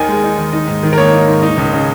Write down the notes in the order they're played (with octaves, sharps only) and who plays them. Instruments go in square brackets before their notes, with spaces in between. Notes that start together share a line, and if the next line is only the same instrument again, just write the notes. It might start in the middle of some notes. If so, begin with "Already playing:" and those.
Already playing: [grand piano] D#2 D#3 D#4 G#5
G#3
D#4
D#2
D#4
G#2
D#3
A#4
A#3 C#5
D#4
G#2
D#4
C#2
C#3